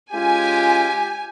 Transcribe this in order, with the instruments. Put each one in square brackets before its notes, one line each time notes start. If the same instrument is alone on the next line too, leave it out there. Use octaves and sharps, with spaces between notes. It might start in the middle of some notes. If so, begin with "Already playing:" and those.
[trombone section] G#3 C#4 F4 [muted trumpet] G4 [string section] G#5